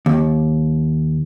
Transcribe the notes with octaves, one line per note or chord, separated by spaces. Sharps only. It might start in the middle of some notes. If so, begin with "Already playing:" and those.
D#2